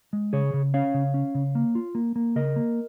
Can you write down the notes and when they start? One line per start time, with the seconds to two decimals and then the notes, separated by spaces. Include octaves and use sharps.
0.13 G#3
0.33 C#3 G#4 C#5
0.54 C#3
0.74 C#4 C#5 F5
0.94 C#3
1.14 C#4
1.35 C#3
1.55 A#3
1.75 F4
1.95 A#3
2.16 A#3
2.36 C#3 A#4 D#5
2.56 A#3